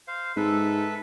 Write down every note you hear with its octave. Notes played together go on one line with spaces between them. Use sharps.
C5 F5
G#2 A4 B4 E5